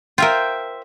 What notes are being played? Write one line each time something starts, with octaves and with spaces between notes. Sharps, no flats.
F4 A#4 C5 E5 G5